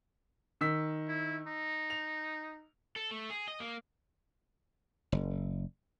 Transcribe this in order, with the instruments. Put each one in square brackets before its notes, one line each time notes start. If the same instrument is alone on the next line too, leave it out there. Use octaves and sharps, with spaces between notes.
[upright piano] D#3 E6 B6
[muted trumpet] E4
D#4
[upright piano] F7
[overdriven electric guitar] A4
A3
G#4
D#5
A#3
[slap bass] F#1